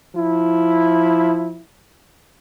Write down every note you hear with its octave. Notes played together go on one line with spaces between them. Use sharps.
F3 E4